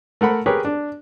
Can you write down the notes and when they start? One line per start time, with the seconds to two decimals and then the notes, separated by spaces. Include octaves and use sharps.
0.21 A3 A#4 F#5 B5
0.46 G4 G#4 A#4 B4 C#5
0.65 D4